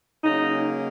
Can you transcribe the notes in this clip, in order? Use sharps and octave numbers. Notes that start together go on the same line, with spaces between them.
C#3 F#3 A#3 D#4